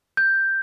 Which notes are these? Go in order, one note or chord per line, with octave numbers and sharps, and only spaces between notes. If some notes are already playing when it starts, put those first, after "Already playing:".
G6